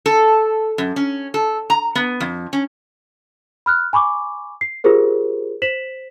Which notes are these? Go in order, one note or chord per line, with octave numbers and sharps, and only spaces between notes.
A4
F#2
C#4
A4
A#5
B3
F2
C#4
B5 F6 F#6
G#5 B5 C#6 D6
C7
F4 G4 G#4 A#4 C5
C5 B6 E7 F#7